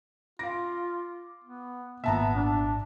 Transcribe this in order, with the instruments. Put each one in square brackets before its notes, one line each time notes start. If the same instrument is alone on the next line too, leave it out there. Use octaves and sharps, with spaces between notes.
[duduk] F4 [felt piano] F5 A#6 [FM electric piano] D6
[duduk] B3
[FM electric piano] G#1 A#2 [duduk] B3 [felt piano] E5 A5 A#5
[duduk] D4